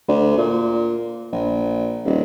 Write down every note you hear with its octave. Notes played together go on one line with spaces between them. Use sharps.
D2
A#2
A#1
D#1